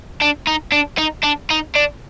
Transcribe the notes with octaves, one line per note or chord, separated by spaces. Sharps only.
D4
D#4
D4
D#4
D4
D#4
D4